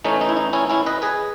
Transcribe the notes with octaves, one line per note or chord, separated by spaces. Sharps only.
E3 A3 C#4 D#4
D#4
E4
D#4
C#4 E4
C#4 E4
B4 D#5
G#4 B4